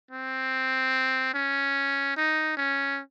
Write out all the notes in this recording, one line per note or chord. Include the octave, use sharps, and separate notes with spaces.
C4
C#4
D#4
C#4